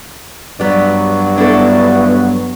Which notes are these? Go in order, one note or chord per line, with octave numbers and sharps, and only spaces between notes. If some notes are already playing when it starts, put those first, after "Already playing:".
G2 F#3 B3 D5
B3 D4 E4 A4